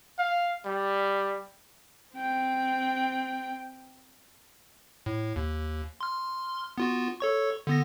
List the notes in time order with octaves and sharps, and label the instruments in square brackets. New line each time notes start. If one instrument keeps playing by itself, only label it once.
[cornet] F5
G3
[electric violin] C4 G5
[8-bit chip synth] A2
D#2
C6 F6
B3 F4 F#4
A4 C#5 C#6
D3 B3 A#6